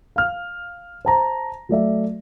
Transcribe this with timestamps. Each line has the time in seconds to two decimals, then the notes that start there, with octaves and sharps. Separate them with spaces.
0.16 F5 F6
1.05 C5 A5 A#5
1.69 F#3 A3 D5 E5